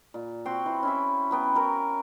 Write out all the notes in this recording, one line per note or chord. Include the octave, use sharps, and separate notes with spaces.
A#2
C4 F#4 G5 C6
E3
C#4 E4 E5
F#3 B3 G5
E4 F#4 A#4